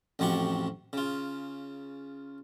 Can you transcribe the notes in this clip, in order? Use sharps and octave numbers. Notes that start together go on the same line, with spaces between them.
A1 F2 F3 F#4 G4 C#6
C#3 F4